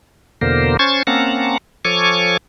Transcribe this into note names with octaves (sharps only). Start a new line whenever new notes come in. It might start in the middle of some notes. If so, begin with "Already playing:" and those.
E2 B2 D3 A#3 A#4 C5
C#4 C5 C#6 G#6 A6
A#3 C4 C#4 F#5 A5 A#5
F3 A4 C#5 G#5 C#6 D6